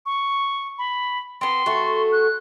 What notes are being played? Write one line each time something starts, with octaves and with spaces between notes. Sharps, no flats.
C#6
B5
B3 C4 C6
A3 F#4
F#6